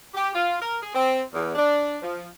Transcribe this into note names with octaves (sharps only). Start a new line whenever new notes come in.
G4
F4
A#4
G#4
C4
E2
D4
F3